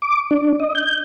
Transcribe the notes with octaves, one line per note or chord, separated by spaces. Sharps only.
D6
D4
D#5
G6